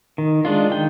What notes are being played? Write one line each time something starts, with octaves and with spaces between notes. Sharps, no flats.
D#3
G#3 D4 F4
D#3 G5